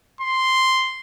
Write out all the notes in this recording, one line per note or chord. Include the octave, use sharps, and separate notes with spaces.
C6